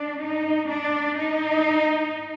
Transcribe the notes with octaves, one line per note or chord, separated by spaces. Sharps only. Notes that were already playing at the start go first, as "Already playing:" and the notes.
Already playing: D4
D#4
D4
D#4